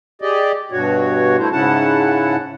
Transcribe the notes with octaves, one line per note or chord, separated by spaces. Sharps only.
G4 G#4 D5 D#5
G2 B2 F#4 C#5
A3 E4 C5
G#2 C#3 C#4 E4 F#5 A5